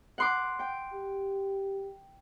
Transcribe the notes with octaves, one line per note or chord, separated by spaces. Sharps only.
F#5 C6 D6
G5
G4